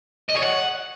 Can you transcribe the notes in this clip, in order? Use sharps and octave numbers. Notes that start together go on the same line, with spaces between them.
D#5
C#5
F#5